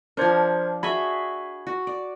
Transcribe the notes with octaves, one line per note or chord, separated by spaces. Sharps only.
F3 D4 A#4 C5 G#6
F#4 G#4 E5 B5 G#6
F#4
D5